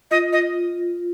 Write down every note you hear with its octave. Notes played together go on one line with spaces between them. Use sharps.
F4 D#5
D#5